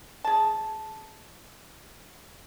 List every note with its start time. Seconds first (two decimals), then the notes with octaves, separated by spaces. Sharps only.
0.24 G#4 A5